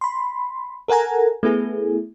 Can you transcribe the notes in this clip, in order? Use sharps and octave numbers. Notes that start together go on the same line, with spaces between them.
B5 C6
A4 A#4 F#5 G#5 A#5
A3 B3 E4 G#4